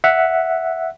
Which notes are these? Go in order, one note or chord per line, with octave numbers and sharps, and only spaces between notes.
E5 F#5